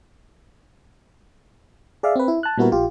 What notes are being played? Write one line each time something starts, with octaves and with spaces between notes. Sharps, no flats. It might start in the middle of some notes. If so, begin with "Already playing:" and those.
G#4 D5 E5 F5
C4 B4
E4
A5 F#6
A#2 G3 B3 E4 F#4 A#4
A#1 F4 G4